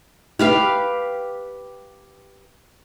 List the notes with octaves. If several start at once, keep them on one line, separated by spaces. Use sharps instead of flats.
G4 B4 F5